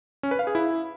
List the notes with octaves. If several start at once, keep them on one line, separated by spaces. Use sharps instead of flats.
C#4
B4
F5
G#4
E4